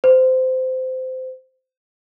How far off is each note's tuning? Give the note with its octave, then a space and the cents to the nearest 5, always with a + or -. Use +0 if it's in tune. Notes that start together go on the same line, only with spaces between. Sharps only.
C5 -20